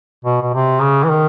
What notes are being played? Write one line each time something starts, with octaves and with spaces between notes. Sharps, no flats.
B2
B2
C3
C#3
E3
D#3